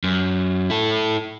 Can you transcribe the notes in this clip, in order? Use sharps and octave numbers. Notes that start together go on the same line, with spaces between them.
F#2
E4 A4